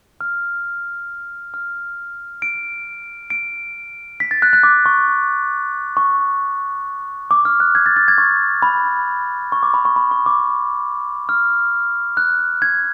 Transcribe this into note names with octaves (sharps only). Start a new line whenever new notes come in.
F6
F6
D7
D7
B6
A6
F#6
F#6
D6
C#6
C#6
D6
F6
F#6
G#6
A6
A6
G#6
C#6
B5
C#6
D6
B5
C#6
B5
C#6
D6
F6
F#6
G#6